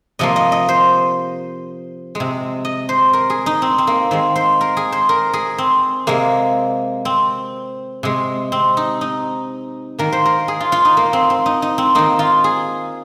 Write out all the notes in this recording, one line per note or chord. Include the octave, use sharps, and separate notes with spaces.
C3 F3 A#3 D#5
D#5
D#5
C5
G#3
C3
D#5
C5
A#4
G#4
D#4
C4
C4
A#3
D#3 G#3 C4
C5
A#4
G#4
C5
A#4
G#4
C4
C3 G#3 A#3
C4
C3 G#3
C4
D#4
D#4
D#3 A#3 A#4
C5
A#4
G#4
F4
F4
D#4
A#3
C4
C4
D#4
D#4
C4
D#3 A#3 D#4
F4
G#4